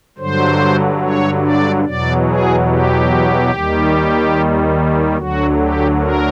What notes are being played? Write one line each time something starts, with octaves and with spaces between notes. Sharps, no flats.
G2 D3 F#3 C5
C#5
D5
E2 B2 F#3 D5
G#4
G4
D#2 D#3 G3
D2 D3 F#3 F#4
G4
A#4